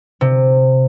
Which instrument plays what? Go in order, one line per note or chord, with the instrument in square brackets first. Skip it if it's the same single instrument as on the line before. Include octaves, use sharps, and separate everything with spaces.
[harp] C3